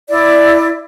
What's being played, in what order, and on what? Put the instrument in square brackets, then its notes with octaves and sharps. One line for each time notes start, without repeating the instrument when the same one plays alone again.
[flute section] E4 D5